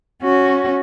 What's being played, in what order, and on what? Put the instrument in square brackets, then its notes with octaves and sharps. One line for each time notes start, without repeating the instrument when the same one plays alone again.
[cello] C#4 F#4